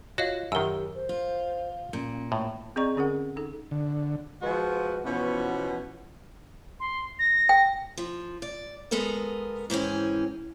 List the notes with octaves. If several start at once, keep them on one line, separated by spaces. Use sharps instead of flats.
F4 F#4 C#5 D#5 F5
F#2 D#3 G4 A#4 E6
C5
F4
A#2 C#4
A2 A#3
C4 G#4 D5 D#5 A#5 C#6
D3 C#4 G#4 A#4 F#5
D#4 A4
D3
F3 G#3 F#4 B4
B2 E3 F3 B3 C#4
C6
A#6
G5
F3
D5
G#3 B3 A4 A#4 D#5
G#2 E3 C4 C#4